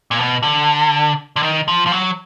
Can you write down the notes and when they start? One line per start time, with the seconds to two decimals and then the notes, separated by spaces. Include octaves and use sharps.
0.11 A#2
0.19 B2
0.43 D3
1.36 D3
1.43 D#3
1.68 F3
1.87 F3
1.92 F#3